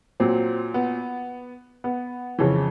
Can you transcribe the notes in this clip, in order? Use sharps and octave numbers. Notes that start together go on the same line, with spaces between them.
A#2 F#3 C4
B3
B3
F2 C#3 E3